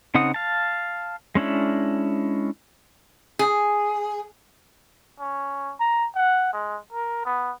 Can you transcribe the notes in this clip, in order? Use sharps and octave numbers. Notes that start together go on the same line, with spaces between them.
C#3 C4 D#4 F#5 D#6
F5 A5
G#3 C#4 D4 E4
G#4
C#4
A#5
F#5
G#3
A#4
B3